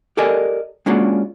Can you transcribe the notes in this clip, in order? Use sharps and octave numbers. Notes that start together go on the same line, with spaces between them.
G4 A4 A#4 D5 D#5 G#5
G#3 A#3 C#4 D4 F4 F#4